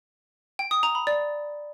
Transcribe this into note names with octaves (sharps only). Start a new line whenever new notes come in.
G5
D#6
A#5
B5
D5